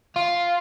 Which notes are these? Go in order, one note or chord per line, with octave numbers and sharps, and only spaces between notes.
F4